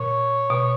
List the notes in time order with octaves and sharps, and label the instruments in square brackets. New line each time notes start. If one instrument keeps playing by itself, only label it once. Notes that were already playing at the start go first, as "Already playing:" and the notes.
Already playing: [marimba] A#2 [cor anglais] C#5
[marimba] B2